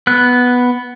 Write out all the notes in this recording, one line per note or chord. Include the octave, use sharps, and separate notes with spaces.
B3 F#6